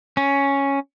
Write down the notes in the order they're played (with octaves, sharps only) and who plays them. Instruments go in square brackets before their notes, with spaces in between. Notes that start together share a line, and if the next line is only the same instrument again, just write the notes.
[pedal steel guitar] C#4